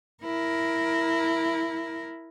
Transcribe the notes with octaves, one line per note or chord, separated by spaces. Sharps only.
E4 A#4